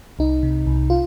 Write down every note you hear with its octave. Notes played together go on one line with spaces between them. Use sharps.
C2 D#4
C3
C2
F4